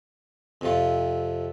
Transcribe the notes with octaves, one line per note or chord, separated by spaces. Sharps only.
F2 C3 F4